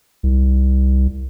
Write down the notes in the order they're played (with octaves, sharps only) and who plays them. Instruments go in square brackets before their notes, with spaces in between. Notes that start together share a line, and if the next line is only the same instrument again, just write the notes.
[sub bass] C2